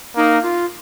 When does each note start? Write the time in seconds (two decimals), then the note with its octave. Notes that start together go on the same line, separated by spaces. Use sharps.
0.17 A#3 D#4
0.43 F4